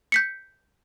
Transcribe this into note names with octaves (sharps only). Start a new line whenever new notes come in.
G6 B6 C#7